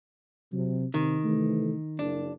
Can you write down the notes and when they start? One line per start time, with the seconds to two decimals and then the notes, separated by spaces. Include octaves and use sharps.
0.52 C3 F#3
0.94 C3 D#3
1.24 C3 E3 A3
1.99 F#1 D4